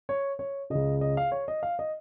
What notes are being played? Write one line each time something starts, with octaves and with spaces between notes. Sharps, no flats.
C#5
C#5
C#2 C#3 D#5
D#5
F5
C#5
D#5
F5
D#5